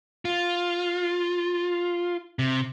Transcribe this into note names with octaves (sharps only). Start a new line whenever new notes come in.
F4
C3